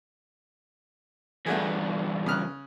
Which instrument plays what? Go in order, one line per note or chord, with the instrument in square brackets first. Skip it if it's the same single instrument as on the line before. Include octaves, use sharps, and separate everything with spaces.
[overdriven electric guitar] E2 G2 [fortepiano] A3 F#4 G#4
[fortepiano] C#3 F6 F#6